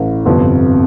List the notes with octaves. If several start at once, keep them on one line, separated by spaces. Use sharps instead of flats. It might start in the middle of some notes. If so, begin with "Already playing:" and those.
Already playing: A1 A2 E3
G1 F2 C3 F3 B3